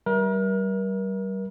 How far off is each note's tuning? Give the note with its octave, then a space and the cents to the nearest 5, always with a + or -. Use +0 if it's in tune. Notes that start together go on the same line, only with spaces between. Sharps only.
G3 -25 A#4 +35 E5 -15